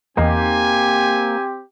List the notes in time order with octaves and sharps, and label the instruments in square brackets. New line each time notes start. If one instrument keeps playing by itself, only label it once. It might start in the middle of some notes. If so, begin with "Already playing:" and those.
[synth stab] E2 D#4 [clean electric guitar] A#3 [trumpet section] C4 G4 [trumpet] G#5